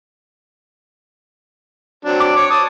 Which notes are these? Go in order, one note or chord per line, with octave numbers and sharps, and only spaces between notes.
F#3 C4 D4
D6
C#5
A5 D#6